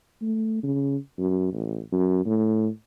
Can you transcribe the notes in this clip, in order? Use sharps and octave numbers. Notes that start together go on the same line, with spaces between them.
A3
C#3
F#2
A1
F#2
A2